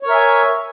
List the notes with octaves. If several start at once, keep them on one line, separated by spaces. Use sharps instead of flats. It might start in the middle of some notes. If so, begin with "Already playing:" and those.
A#4 C#5 E5 G#5